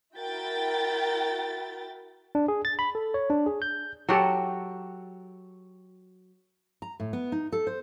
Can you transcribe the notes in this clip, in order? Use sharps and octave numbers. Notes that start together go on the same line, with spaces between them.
E4 F#4 A#4 G5 A6
D4
G#4
A6
B5
A4
C#5
D4
G#4
G6
F#3 F#4 G4 A4
A#5
A2
B3
D#4
A4
C5